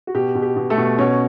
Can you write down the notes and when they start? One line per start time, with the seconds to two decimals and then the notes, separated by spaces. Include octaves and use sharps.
0.07 F#4
0.14 B2 G4
0.35 B2
0.42 G4
0.56 B2
0.70 A3 A4
0.78 B2
0.98 B2 C#4 C#5